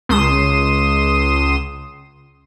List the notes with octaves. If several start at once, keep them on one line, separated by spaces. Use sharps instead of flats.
C#2 C6 D#6 E7